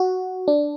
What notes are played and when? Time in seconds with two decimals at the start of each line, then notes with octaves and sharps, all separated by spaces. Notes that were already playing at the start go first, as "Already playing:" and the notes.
Already playing: F#4
0.48 D4